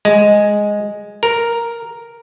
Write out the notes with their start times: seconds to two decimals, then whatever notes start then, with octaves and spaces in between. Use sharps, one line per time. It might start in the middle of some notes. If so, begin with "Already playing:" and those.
0.05 G#3
1.23 A#4